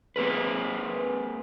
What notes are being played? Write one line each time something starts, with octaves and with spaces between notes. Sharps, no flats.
A#3 C4 G#4 B4